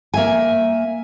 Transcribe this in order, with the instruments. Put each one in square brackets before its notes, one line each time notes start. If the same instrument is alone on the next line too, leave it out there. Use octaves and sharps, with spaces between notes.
[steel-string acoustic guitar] A#3 E5 G#5